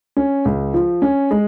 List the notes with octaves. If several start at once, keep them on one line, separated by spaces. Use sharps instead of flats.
C#4
C#2
F3
C#4
G#3